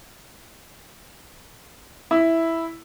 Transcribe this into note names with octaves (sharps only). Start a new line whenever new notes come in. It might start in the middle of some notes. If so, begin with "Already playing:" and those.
E4